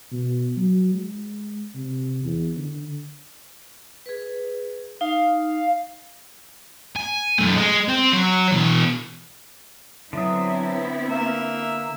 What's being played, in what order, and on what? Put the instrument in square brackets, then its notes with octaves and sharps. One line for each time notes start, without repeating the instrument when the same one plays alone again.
[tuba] B2
F#3
G#3
C3
E2
D3
[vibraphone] G#4 B4
[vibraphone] D#4 [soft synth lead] F5
[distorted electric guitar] G#5
F#2 A3
G#3
C4
F#3
B2 E3
[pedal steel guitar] D3 D4 D#6 [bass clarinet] F#3 [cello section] B3 C4 E4
[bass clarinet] A#3 [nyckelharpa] E5